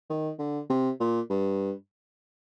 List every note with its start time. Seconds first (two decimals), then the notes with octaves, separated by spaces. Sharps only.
0.10 D#3
0.39 D3
0.70 C3
1.00 A#2
1.30 G2